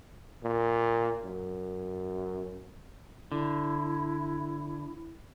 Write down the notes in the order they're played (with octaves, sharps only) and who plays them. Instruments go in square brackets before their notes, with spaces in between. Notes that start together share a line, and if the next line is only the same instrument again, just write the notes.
[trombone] A#2
F#2
[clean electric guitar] D3 [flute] E4